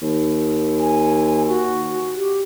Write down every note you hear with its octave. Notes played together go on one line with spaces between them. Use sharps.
D#2
G#5
F#4
G4